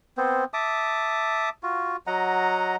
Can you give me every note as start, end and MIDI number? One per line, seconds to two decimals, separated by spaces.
0.17 0.45 59
0.17 0.45 60
0.17 0.45 72
0.54 1.49 76
0.54 1.49 81
0.54 1.49 86
0.54 1.49 87
1.63 1.96 65
1.63 1.96 66
2.07 2.76 54
2.07 2.76 75
2.07 2.76 78
2.07 2.76 82